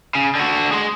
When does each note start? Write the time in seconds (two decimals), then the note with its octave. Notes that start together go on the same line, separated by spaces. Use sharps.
0.15 C#3
0.35 D3 F#4
0.72 G#4 C6